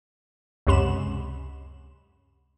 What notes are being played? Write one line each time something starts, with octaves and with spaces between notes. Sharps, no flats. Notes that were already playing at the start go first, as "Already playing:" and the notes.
C#2 F#2 C3 B5 E7